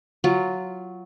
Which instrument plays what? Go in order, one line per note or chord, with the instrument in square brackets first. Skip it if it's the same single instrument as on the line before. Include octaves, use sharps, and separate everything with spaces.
[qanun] F#3 F4